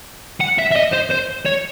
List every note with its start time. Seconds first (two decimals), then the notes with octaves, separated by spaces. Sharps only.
0.41 F#5
0.59 E5
0.72 E5
0.76 D#5
0.93 C5
1.11 C5
1.46 C#5